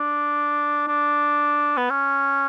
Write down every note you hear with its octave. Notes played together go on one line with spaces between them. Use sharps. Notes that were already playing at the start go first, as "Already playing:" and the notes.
Already playing: D4
D4
B3
C#4